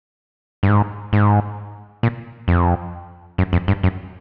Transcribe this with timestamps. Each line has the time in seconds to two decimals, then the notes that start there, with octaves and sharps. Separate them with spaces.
0.63 G2
0.69 G#2
1.13 G#2
2.03 A#2
2.48 F2
3.38 F#2
3.53 F2
3.68 G2
3.83 F#2